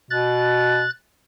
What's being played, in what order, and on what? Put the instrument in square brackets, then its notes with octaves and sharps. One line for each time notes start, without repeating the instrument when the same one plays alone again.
[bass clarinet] B2 [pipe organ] F#6 A6